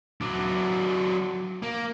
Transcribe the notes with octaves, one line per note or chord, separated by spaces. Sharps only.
F#3 D4
A#3